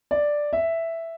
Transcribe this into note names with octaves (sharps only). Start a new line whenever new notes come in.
D5
E5